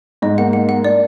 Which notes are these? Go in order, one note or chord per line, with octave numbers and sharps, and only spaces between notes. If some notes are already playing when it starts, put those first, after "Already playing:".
G#2 D#5
A#3 F#5
A#3 F#5
A#3 F#5
D4 D5